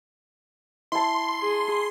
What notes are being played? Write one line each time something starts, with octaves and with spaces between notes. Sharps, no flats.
E4 A5 C6
G#4